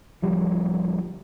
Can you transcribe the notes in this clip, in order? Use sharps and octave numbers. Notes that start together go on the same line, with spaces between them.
D1 F3 G3